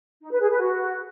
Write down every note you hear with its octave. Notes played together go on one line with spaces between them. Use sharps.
D#4
B4
G#4
B4
F#4